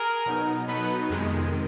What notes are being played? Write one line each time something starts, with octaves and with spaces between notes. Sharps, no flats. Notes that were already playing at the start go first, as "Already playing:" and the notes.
Already playing: G#4 A#4
B2 F#3 B3 D#4
B2 F#3 B3 D#4 A4 B4
F2 C3 D#3 G#3
C3 D#3